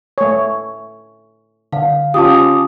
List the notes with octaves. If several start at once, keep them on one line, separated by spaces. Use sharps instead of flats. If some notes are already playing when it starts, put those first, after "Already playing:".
A3 C#5
D3 F5
C#4 F4 G4 A5 D6 D#6